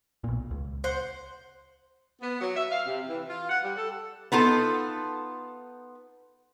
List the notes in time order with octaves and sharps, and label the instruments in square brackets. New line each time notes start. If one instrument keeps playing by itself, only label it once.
[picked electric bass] B1 A#2
C#2
[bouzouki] C5 F#5
[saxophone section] B3
F#3
E5
F5
C3
E3
F4
F#5
G3
A4
[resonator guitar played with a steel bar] B3 D#4 F4 A4